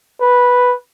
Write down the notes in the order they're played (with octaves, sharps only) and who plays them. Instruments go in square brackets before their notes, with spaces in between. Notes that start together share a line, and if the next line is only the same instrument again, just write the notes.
[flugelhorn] B4